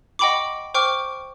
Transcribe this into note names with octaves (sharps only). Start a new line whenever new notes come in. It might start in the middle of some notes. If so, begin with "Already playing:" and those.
D#5 F#5 G5 B5 C#6 D6
C5 G5 C#6 D6 F6